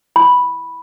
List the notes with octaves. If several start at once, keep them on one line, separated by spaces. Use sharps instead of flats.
B5